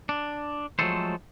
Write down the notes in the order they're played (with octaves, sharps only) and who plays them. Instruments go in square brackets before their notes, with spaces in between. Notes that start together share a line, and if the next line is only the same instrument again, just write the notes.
[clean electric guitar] D4
F3 F#3 G#3 A3 A4 C5